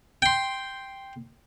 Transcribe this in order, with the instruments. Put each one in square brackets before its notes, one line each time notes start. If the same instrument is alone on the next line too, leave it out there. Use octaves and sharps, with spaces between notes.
[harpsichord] G5 C6